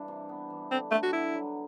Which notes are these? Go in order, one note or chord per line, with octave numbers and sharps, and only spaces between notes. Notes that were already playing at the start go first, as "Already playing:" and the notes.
Already playing: G2 E3 D4
C3
B3
E3
D3 C4
D3 A3
F#4
B3 E4
F#3